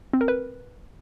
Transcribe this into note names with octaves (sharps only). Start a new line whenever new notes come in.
C4
A#4
B4